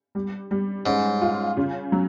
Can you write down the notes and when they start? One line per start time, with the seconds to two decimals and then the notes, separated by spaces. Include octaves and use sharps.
0.15 G3
0.51 G3
0.86 G#2 C#4
1.22 F4
1.57 C#3
1.92 F#3